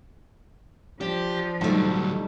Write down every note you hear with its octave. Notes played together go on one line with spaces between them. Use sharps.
F3 D4 G4
B1 D3 F#3 G3 A3